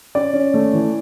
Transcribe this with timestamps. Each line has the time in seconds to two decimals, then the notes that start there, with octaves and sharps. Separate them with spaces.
0.15 C#4 D5
0.33 C#4
0.54 A3
0.73 E3